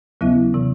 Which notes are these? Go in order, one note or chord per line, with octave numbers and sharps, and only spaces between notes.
D#2 C#3 F#3 B3 E4
C3 E3